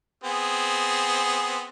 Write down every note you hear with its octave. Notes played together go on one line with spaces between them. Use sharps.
B3 C4 G#4